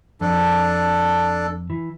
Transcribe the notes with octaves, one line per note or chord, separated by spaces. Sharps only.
F2 D4 A4
E3